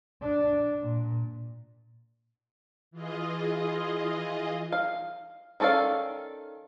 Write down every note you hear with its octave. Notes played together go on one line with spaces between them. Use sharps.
D4
A#2
E3 F4 G#4 D#5
F5
D#3 C#4 A4 D5 F5